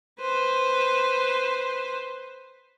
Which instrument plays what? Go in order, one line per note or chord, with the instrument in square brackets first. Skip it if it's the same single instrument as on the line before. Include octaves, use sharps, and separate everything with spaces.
[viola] B4 C5